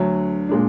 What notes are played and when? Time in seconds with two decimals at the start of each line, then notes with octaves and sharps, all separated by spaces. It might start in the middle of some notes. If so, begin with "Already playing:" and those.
Already playing: D2 D3 F#3
0.49 A#2 G#3 D4